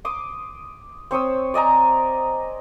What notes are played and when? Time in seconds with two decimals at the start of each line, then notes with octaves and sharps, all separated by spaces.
0.05 C6 D6 D#6
1.11 C4 C#5 D#6 E6
1.54 D5 D#5 G#5 A#5